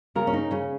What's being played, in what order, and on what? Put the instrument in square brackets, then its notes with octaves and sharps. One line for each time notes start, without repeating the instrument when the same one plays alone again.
[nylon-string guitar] C#3 A#4
C#4
D#4
C#3 C#4